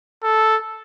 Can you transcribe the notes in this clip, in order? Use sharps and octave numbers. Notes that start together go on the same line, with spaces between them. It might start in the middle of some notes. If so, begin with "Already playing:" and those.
A4